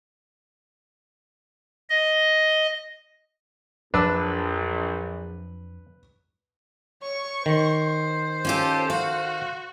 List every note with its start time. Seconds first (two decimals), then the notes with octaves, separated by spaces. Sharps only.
1.89 D#5
3.94 A#1 F2 F3 F#3 D4 B4 E6
7.02 C#5 C#6
7.46 D#3 C5
8.45 C#4 F4 G4 A4
8.90 F#4 F5